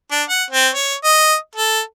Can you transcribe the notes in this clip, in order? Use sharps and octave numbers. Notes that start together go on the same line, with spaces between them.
D4
F#5
C4
C#5
D#5
A4